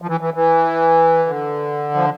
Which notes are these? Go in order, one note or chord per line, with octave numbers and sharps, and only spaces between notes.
F3
E3
E3
E3
D3
F3